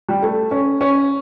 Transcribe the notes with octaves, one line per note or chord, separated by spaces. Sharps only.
G3
A3
C#4
C#4